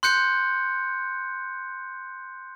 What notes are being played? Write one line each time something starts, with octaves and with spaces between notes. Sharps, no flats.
C6 F#6 G6 C#7